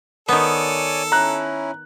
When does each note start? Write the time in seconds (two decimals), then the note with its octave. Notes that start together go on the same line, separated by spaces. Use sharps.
0.29 D#3 B3 A4 C#5 D5 G#5
1.12 C#4 E4 A#5 F#6